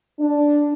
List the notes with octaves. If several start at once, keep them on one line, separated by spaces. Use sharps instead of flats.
D4